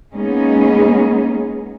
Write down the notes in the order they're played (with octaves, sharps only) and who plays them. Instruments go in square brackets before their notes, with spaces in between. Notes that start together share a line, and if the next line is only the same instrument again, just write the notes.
[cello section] G#3 A#3 B3 C#4 D#4 G#4